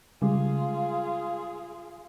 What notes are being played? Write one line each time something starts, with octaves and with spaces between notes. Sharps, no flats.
C#3 G3 G#3 F4 G#4